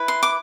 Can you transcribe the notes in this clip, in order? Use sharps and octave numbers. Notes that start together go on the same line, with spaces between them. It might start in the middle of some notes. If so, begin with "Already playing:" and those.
Already playing: E4 B4
C6
D6